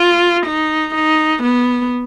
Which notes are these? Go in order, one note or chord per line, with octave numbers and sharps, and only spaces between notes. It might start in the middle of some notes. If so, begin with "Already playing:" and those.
Already playing: F4
D#4
D#4
B3